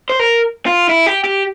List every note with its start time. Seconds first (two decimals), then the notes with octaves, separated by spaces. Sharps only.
0.10 C5
0.19 A#4
0.66 F4
0.89 E4
1.06 G4
1.24 G4